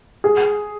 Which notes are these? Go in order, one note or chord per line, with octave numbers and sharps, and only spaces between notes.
G#4